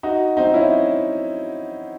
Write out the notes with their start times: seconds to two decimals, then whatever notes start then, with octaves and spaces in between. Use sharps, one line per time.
0.03 D#4 F#4
0.37 C4 D#4
0.54 C#4 E4